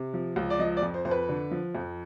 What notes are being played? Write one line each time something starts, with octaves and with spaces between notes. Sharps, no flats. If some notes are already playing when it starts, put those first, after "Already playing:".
Already playing: C3
F3
C#2
D5
F3 D#5
D5
F2
C5
F2 C5
B4
D3
F3
F2